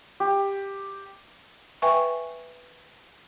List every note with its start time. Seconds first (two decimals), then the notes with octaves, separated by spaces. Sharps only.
0.20 G4
1.82 B4 E5 G5 G#5 C#6